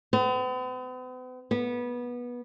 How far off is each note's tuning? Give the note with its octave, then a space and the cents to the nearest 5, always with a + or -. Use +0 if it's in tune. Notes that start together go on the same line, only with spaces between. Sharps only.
B3 +45
B3 -20